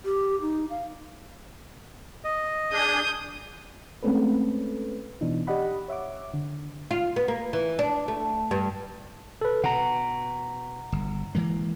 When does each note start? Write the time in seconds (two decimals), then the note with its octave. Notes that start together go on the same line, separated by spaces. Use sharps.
0.05 G4
0.41 D#4
0.70 F5
2.24 D#5
2.72 D4 G#4 D#6 G6
4.03 G#3 A3 C4 C#4 A4 B4
5.21 B2 E3 D4 D#4
5.47 G4 D5 D#5 F#5 B5
5.88 C#5 E5 F#5 D6
6.34 D3
6.91 F4
7.16 B3
7.28 A#3
7.53 E3
7.79 D4
8.08 A3
8.51 G2
9.41 A4 B4
9.64 B2 F#5 A#5
10.92 G1
11.35 E3 G#3 A#3